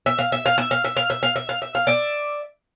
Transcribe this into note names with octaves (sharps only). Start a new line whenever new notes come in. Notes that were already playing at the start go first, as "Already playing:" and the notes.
E5
F5
E5
F5
E5
F5
E5
F5
E5
F5
E5
F5
E5
F5
D5 E5